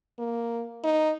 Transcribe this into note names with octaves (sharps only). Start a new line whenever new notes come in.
A#3
D#4